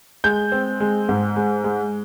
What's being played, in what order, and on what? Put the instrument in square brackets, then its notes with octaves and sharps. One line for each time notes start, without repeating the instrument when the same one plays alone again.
[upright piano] G#3 G6
C4
G#3
G#2
G#3
G#3